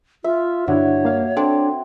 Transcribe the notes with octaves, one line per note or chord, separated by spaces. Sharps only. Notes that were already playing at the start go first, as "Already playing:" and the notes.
F4 E5
G2 D3 D4 E4 F#4 C#5
A#3 F5
C4 D4 A4